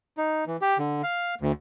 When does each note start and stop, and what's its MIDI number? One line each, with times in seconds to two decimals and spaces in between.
0.17 0.45 63
0.47 0.57 52
0.62 0.78 67
0.78 1.02 50
1.03 1.35 77
1.41 1.52 38